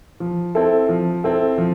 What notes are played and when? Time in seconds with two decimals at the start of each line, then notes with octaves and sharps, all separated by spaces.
0.20 F3
0.55 C4 E4 A4
0.89 F3
1.24 C4 E4 A4
1.58 F3